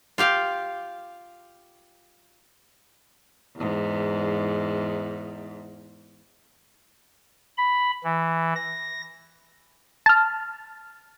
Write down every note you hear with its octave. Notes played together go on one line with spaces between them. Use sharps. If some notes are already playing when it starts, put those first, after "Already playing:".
F4 G4 F5 G5
E2 G#2
B5
E3
A#6
A5 F6